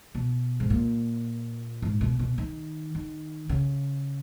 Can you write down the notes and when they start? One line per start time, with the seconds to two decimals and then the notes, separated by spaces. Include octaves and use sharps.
0.15 B2
0.60 G#2
0.70 A#2
1.82 G#2
2.01 B2
2.19 B2
2.38 D#3
2.95 D#3
3.49 C#3